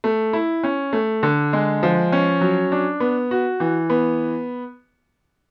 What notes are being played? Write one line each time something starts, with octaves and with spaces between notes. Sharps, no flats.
A3
E4
C#4
A3
D3
G#3
F3
C#4
F#3
D4
B3
F#4
E3
B3